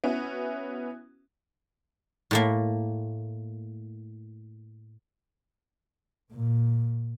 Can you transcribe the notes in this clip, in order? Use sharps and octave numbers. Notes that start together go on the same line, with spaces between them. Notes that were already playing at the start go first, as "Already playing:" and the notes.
B3 C#4 E4 F#4
A2 A3 A#3
A#2